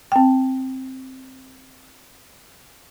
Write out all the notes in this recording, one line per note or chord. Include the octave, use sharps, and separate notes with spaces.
C4 G5